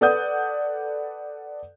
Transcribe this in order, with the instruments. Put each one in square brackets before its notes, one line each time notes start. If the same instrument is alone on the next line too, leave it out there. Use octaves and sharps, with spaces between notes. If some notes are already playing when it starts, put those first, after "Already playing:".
[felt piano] A4 B4 D5 F#5 D#6 G6